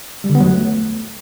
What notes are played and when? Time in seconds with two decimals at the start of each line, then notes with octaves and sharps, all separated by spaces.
0.24 G3
0.30 D3
0.35 B3
0.41 F#3
0.46 A3